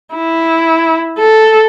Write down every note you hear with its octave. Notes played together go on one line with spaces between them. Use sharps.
E4
A4